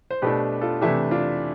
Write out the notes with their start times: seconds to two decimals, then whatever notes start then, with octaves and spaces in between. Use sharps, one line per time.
0.11 C5
0.22 B2 A3 D4 G4 B4
0.61 F4 A4
0.81 C3 E3 A3 D4 E4 G4
1.11 D4 F4